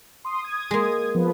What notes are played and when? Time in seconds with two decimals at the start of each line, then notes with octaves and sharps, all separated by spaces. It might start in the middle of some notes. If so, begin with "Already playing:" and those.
0.25 C6 D#6
0.42 D#6 G#6
0.71 G#3 A#3
1.15 F3 B3